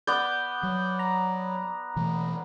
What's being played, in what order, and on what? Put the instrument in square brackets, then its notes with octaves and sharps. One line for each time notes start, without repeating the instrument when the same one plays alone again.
[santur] B3 D5 [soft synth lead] G6
[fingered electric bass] F#3
[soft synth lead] A#5
[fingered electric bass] B2 E3 A3